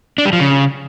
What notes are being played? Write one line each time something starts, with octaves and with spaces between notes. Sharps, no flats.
D4
G3
F3
C#3